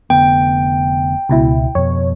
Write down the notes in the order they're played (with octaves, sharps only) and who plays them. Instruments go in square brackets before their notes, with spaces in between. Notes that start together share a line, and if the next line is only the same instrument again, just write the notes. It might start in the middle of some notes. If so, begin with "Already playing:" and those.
[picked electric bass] F1 D3 B3 [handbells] G5
[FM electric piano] C#2 B2 E4
[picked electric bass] F2 B2 [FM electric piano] C#5